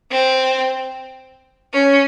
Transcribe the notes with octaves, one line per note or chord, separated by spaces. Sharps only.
C4
C#4